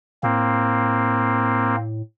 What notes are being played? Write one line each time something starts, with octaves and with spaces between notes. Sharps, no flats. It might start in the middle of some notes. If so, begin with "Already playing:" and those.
A2 A#3 C4